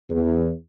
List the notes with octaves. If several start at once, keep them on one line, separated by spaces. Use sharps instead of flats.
E2